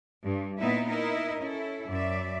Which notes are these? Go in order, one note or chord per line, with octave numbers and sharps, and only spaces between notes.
G2
A#2 B3 D#4 E4 B4 E5
D#4 E4 A#4 D#5
C#4 E4 A4
F#2 D5 E5